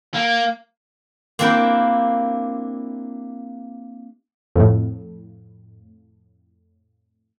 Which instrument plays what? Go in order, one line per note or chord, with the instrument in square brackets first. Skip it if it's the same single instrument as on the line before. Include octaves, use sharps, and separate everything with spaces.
[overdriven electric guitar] A#3
[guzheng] A#3 C4 D4 E4 G4 G5
[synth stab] F2 A2